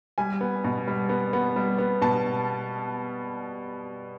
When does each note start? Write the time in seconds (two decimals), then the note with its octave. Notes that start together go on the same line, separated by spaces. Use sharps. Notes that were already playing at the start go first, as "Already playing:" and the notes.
0.18 G3 G#5
0.41 B3
0.64 B2
0.88 G3
1.09 B3
1.33 B3
1.56 G3
1.78 B3
2.02 B2 A5